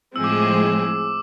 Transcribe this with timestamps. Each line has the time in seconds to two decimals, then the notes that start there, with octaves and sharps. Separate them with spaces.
0.15 A2 F3 G#3 C4 G#4 E6
0.24 D6
0.40 D6